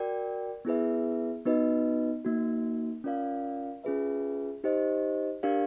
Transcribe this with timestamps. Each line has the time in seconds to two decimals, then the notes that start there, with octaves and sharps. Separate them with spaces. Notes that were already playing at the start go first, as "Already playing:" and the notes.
Already playing: F#4 A#4 D5 G5
0.65 B3 E4 G#4 B4 E5
1.45 B3 D#4 F#4 B4 D#5
2.25 A#3 D#4 F#4
3.04 C#4 F4 A#4 D5 F5
3.84 C#4 F4 G#4 B4 E5
4.64 D#4 G4 C5 D#5
5.43 D4 G4 A#4 D5 F5